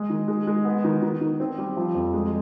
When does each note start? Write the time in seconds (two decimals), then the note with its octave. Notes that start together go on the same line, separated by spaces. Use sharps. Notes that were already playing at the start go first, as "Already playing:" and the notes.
Already playing: G#3
0.10 D#3
0.28 G#3
0.47 G#3
0.65 B3
0.84 D#3
1.02 D#3
1.21 D#3
1.40 C4
1.58 G3
1.77 F3
1.95 F2
2.13 G#3